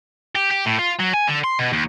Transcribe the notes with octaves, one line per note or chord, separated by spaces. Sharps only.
G4
G4
A2
F4
F#3
G#5
D3
C6
B2
D#2